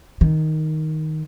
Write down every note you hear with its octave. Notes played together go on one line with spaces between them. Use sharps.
D#3